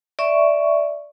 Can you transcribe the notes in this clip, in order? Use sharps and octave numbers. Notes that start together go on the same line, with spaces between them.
D5 E5 C#6